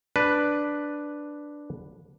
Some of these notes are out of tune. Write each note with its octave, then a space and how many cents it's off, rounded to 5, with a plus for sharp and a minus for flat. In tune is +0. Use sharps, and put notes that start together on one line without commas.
D4 +0 B4 +0